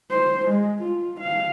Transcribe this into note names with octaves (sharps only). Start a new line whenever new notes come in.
C5
G#3
F4
F5